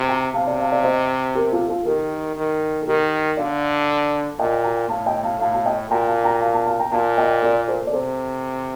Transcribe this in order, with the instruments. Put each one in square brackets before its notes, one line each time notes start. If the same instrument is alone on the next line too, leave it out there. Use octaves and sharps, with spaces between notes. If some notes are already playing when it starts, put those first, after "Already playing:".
Already playing: [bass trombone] C3
[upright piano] G5 A#5
[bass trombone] C3 [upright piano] F5 A5
[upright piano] D5 F5
F5 A5
D5 F5
C5 D#5
G4 A#4
F4 A4
F4 A4
[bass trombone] D#3 [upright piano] G4 A#4
[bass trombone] D#3
[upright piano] A4
[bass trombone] D#3 [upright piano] G4 A#4
[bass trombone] D3 [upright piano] D5 F5
[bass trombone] A#2 [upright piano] D#5 G5
[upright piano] G5 A#5
[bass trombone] A2 [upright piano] F5 A5
[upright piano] D#5 G5
F5 A5
[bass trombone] A2 [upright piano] F5 A5
[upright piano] F5 A5
D#5 G5
[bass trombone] A#2 [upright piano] G5 A#5
[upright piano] F5 A5
G5 A#5
F5 A5
F5 A5
F5 A5
G5 A#5
[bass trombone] A#2 [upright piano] F5 A5
[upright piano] D#5 G5
A#4 D5
A4 C5
D5
[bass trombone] C3 [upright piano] A4 C5